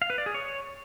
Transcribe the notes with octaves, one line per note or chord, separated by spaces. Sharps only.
F5
B4
D5
G#4
C#5